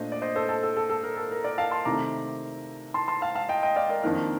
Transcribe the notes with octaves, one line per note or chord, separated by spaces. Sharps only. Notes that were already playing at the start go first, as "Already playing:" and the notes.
Already playing: A#2 A3 D4 C5 D#5
D5
C5 D#5
A4 C5
A4
A4
A4
A4
A#4
A4
A#4
A#4 D5
F5 A5
A5 C6
C3 D#3 A3 A#5 D6
A5 C6
A5 C6
F5 A5
F5 A5
D#5 G5
D#5 G5
D5 F5
A#4 D5
F2 D#3 A#3 D4 A#4